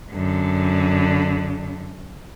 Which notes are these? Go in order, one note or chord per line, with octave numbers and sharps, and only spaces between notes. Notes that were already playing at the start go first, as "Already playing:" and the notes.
F#2 D3